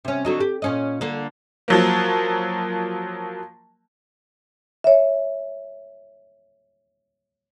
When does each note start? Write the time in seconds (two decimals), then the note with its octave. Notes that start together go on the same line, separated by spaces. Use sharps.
0.05 C3 C#4
0.25 D3 F#3 D#4
0.40 G4
0.62 A#2 C#4 D#5
1.01 D3 A#3
1.68 F3 F#3 A#3
4.84 C#5 E5